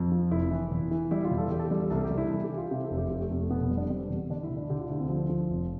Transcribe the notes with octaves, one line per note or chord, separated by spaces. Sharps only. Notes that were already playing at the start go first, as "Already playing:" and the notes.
Already playing: F2
F3
F1 E4
E3
E2
E3
G3 E4
F4
E2
A4
E2 G4
A4
G4
G3
A4
C2 A4
G4
G3
E4
E3 A4
G4
E3
F4
C3 G4
A4
F1
G4
F1 G4
A3
F1 B3
A3
B2 B3
B3
G3
D4
G3 C4
E2
B3
D3 D4
E4
D2
D4
D3 G4
F4
D2 E4
C4
F3
F3
F1